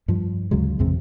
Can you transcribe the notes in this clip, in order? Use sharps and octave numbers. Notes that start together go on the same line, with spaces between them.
G2 F3
D2 C#3 F#3 G#3
A1 E2 C3 G#3